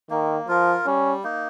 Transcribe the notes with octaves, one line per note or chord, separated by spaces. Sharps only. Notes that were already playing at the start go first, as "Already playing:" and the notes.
D#3 A#3
F3 F4 A#4
G3 C#4
A#3 D#4